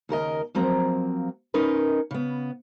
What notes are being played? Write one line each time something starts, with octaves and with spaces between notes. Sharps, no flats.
D#2 C#3 A#4 D#5
F3 F#3 A#3 C4 A#5
C#4 D#4 A#4 B4
C#3 B3